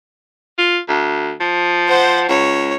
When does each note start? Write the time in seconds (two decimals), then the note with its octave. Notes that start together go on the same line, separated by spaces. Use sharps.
0.58 F4
0.88 D2
1.40 F3
1.88 C5 F#5
2.29 C#2 C#5